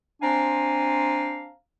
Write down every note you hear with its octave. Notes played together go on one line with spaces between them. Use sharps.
C4 D4 C5 F5 G#5 A#5